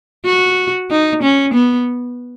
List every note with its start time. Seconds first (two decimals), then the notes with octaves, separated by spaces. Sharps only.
0.25 F#4
0.91 D#4
1.23 C#4
1.54 B3